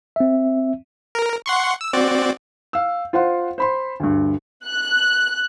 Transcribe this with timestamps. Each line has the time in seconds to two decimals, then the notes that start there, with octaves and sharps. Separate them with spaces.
0.16 C4 E5
1.15 A#4
1.46 F#5 C6 C#6
1.81 E6
1.93 C4 F#4 D5
2.73 F5 E6
3.13 F4 C5 F5 F#5 C6
3.58 C5 B5 C6
4.00 D2 G2
4.66 F#6